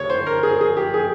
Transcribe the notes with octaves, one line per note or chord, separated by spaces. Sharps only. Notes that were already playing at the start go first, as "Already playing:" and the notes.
Already playing: D2 C3 C#5
C5
A#4
G#4
G#4
G4
G#4